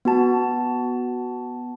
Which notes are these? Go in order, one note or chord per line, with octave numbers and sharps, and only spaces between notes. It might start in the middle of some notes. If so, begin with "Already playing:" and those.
B3 F#4 A5